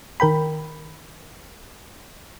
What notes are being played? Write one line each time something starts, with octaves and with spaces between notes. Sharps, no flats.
D#3 A#4 G5 B5